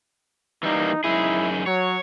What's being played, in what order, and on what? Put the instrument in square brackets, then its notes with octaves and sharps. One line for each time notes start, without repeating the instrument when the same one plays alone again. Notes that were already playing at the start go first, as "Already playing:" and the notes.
[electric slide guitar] E3 G3 A#3 [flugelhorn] D#4
[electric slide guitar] F#2 D#4 G#4 [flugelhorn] E4
[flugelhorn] F#3 [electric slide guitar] C#5